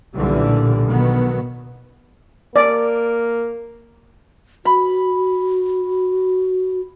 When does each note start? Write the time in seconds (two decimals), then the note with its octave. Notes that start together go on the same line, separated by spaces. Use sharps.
0.15 B1 A#2 D3 E3 G3
0.86 B2 D#3 F#3 B3
2.56 A#3 D5
4.65 F#4 B5